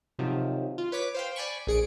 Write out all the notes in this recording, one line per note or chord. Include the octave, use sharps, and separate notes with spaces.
C3 D#3 F3 F#3
F4
B4 C#5 D6 B6
C5 F5 G5
D5 G#5 B5 C#6
A#1 G#4 C#7 D7